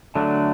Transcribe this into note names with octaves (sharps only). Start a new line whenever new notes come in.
D3 F#3 A3 D4